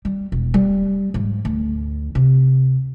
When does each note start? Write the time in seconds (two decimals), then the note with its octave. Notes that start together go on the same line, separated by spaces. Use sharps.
0.05 G3
0.32 E1
0.54 G3
1.14 G#2 F3
1.45 D2
2.15 C3